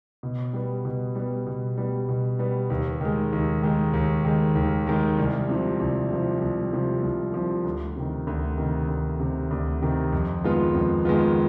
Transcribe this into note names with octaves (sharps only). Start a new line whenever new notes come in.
B2
G3 B3
B2
G3 B3
B2
G3 B3
B2
G3 B3
D#2
D#3 G#3
D#2
D#3 G#3
D#2
D#3 G#3
D#2
D#3 G#3
C2
C3 F3
C2
C3 F3
C2
C3 F3
C2
C3 F3
D2
C3 D#3
D2
C3 D#3
D2
C3 D#3
D2
C3 D#3
F2
D#3 G#3 B3 F4
F2
D#3 G#3 B3 F4